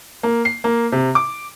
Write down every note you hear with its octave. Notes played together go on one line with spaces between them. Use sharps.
A#3
C7
A#3
C3
D6